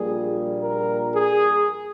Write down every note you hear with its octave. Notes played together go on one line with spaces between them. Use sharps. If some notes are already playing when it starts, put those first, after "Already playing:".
Already playing: A#1 A#2 G3 G#4
A#4
G#4